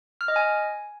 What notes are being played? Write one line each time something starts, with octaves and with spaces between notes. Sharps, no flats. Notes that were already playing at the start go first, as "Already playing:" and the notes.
F6
D#5
G#5